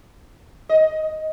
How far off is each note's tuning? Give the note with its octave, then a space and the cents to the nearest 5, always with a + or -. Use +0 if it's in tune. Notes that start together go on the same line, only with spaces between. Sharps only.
D#5 +5